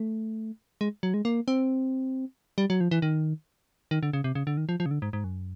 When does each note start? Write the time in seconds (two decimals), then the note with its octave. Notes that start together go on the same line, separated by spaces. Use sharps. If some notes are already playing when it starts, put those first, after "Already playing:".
Already playing: A3
0.81 G#3
1.03 F#3
1.14 G#3
1.25 A#3
1.48 C4
2.58 G3
2.70 F#3
2.80 F3
2.91 E3
3.02 D#3
3.91 D#3
4.03 D3
4.13 C#3
4.24 C3
4.35 C#3
4.47 D3
4.57 D#3
4.69 F3
4.80 F3
4.86 C#3
4.91 D3
5.02 G#2
5.13 G#2
5.24 F#2